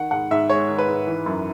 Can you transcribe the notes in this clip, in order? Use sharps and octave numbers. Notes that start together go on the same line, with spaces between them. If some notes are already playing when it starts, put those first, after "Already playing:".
Already playing: D#3 F#5
G#2 F#5
G#2 E5
G#3 C#5
D#3
B4
G#2
E3
F#2